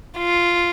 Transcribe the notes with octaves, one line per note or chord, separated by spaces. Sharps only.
F4